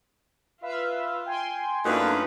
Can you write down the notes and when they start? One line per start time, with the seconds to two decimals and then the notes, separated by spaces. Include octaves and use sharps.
0.62 F4 B4 E5 F5
1.26 G5 G#5 C6
1.85 F#2 A3 A#3 D4 D#4 F4 B4